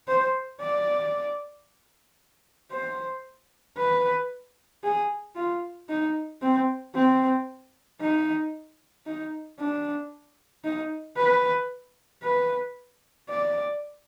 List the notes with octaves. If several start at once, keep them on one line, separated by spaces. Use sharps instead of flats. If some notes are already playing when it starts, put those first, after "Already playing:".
C5
D5
C5
B4
G#4
F4
D#4
C4
C4
D#4
D#4
D4
D#4
B4
B4
D5